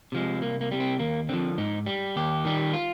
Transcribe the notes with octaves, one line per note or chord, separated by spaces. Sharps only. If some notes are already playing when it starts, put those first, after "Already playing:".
C3 F3 G#3
C2 A#3
A#3
C3 G3
C4
D#2 A#3
D3 F3 C4
G#2 D#4
G3
D#2 G4
D#3 G3
F4